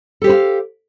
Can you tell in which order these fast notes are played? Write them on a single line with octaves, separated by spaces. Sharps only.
A4 G4 C5 E4 F5